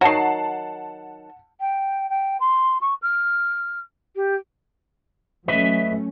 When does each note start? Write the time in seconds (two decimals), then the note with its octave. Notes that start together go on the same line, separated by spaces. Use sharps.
0.01 D#3 F#3 F#5 A5 C7
1.60 G5
2.09 G5
2.40 C6
2.81 C#6
3.02 F6
4.15 G4
5.48 F#3 A3 C#4 B4 D#5 E5